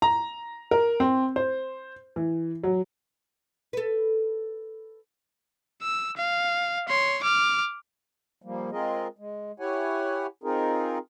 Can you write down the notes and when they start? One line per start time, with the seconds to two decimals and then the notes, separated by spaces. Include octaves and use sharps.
0.02 A#5
0.71 A#4
1.00 C4
1.36 C5
2.16 E3
2.63 F#3
3.73 A4 B4
5.82 E6
6.17 F5
6.89 C#5 C6
7.23 D6 F6
8.42 F3 G3 A#3
8.72 G#3 C4 F4 G#4 A#4 D#5
9.19 G#3
9.60 E4 G4 C#5 F#5 G#5
10.44 C4 D#4 F4 G#4 A#4